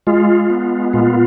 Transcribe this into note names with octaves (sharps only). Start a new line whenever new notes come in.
G#3 F4
B3
A#2 F4